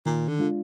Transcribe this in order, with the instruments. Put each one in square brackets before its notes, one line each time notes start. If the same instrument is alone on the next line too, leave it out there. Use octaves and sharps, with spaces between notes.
[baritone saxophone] A#2 [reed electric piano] D#3
[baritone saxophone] D3
[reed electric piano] G#3 D4 F4